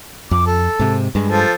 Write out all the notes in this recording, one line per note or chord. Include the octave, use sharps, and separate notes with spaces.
F2 D6
A4
G#2 C3
G2 G#3
F3 A4